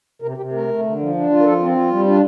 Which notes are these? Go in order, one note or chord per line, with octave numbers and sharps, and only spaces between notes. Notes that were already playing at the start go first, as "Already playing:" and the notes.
C3 A#4
C3 G4
A3 A#4
A3
D3
F3
D4
F4
A#4
F3 A4
C4
F4
G3
D4 F4